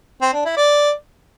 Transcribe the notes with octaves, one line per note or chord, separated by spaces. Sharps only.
C4
D4
E4
D5